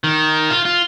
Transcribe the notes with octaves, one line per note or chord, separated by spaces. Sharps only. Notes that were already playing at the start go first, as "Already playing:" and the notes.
D#3
F4
F4